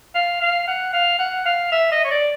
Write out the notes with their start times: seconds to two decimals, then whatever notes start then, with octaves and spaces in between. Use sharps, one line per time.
0.15 F5
0.41 F5
0.68 F#5
0.93 F5
1.19 F#5
1.46 F5
1.72 E5
1.92 D#5
2.04 C#5
2.11 D5